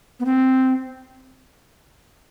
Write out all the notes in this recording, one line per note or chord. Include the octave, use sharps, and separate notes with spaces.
B3
C4